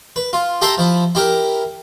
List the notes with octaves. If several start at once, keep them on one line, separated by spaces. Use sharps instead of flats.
B4
F4
G4 A4 E5 A#5 C6
F3 E4
E4 G4 A#4